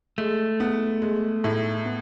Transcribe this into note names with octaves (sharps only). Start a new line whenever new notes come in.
G#3 A3
B3
G#3
A2
B3